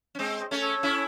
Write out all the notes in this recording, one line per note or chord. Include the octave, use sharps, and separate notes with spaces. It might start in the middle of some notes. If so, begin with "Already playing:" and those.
C#4
G#3 C4 C5 D#5
C5 D#5
A3 C#4
A4 C#5
C#4 E4